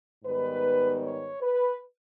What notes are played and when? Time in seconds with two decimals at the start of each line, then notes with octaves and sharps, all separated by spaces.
0.24 G#2 D#3 G3 B3 B4
1.02 C#5
1.42 B4